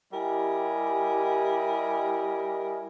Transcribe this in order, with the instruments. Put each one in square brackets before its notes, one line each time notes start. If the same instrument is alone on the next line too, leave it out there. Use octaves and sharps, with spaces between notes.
[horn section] G3 E4 G4 A#4 D#5 G#5